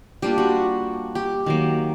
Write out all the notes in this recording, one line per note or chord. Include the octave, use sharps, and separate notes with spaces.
G3 A#3 D4 F4 G4
F#4
G4
D#3 F#3 A#3